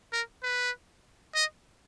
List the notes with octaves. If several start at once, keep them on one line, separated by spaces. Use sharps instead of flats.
A#4
B4
D#5